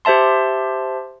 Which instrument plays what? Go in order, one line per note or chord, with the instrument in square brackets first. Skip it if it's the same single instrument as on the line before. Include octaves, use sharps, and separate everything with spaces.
[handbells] G4 C5 E5 A5 C6